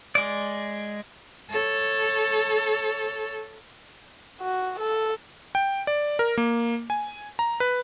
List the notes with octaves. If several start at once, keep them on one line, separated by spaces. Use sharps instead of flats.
G#3 D5
A4 C#5
F#4
A4
G5
D5
A#4
A#3
G#5
A#5
B4